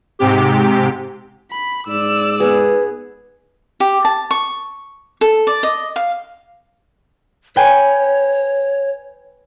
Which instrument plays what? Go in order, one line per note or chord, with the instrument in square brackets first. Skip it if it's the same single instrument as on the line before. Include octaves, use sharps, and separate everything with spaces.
[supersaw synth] G#2 C3 G4
[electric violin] B5
[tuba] G#2 [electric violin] D5 E6
[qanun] B3 G#4 [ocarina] B4
[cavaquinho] G4
A5
C#6
A4
D5
D#5
F5
[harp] B4 G5 G#5 [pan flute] C#5